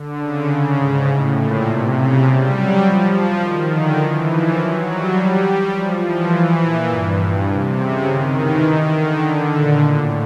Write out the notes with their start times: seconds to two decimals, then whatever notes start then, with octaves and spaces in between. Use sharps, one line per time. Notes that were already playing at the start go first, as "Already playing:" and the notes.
Already playing: D3
0.19 C#3
0.78 G#2
1.07 A2
1.36 A#2
1.65 C3
1.94 C#3
2.23 G3
2.52 F#3
2.81 F3
3.40 D#3
3.69 D3
3.98 E3
4.27 F3
4.56 F#3
4.85 G3
5.73 F3
6.02 E3
6.60 A#2
6.89 G2
7.18 G2
7.47 C3
7.77 C#3
8.06 D#3
8.35 E3
8.64 D#3
8.93 D3
9.52 A#2
9.81 A2